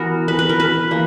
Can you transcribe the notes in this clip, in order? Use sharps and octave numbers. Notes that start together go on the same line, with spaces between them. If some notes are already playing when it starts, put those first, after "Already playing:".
Already playing: E3 B3 F#4 A#4
B4
B4
A#4
B4
E3 A#3